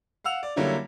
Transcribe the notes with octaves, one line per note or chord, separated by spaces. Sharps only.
F5 F#5 E6 F7
D5
D3 F#3 G3 A#3 C#4 E4